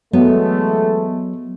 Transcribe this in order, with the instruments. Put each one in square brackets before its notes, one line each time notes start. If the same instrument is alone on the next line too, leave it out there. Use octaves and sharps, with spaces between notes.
[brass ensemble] E3 G#3 A3 [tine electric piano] F#3 [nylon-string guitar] B3